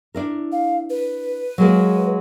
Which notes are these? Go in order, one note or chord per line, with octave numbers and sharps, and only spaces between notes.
D4 E4 A#4
F5
B4
F#3 G#3 A#3